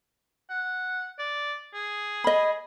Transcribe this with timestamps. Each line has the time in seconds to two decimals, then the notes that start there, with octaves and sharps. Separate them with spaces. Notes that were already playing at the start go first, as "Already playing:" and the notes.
0.50 F#5
1.19 D5
1.74 G#4
2.24 D#5 B5